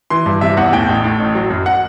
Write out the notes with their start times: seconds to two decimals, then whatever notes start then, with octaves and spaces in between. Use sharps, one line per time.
0.10 E3 C6
0.26 G2
0.41 C3 E5
0.57 E2 F#5
0.73 A2 G5
0.88 A1
1.04 A2
1.20 A1
1.35 F#3
1.50 F#2
1.66 F#5